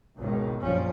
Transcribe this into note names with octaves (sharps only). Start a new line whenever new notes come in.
G#1 C#2 B2 D#3
F1 A#1 F#2 F3 G3 C#4